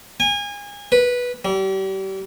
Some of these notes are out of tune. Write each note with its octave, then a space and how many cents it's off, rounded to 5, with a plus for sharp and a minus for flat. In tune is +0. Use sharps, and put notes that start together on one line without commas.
G#5 -30
B4 -10
G3 -35